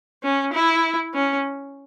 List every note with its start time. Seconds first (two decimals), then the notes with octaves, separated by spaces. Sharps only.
0.23 C#4
0.53 E4
1.14 C#4